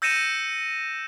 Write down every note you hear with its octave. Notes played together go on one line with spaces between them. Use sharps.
E6 G6 A#6 C#7 D#7 E7